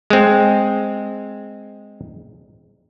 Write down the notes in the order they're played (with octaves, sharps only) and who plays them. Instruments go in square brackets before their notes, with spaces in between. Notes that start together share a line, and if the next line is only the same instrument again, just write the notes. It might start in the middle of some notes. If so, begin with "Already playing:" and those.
[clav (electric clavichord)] G#3 C4